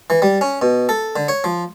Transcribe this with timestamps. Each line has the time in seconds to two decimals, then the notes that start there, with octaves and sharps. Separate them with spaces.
0.10 E3
0.22 G3
0.41 C#4
0.62 B2
0.89 A4
1.16 D3
1.28 C#5
1.44 F3